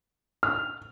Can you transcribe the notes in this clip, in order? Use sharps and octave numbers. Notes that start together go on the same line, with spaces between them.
F6